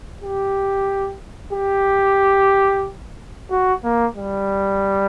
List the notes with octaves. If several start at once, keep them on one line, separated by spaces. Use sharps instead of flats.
G4
G4
F#4
A#3
G3